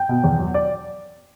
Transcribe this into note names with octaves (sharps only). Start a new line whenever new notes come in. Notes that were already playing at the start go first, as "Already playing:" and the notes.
Already playing: G5
B2
E2
F#3
D5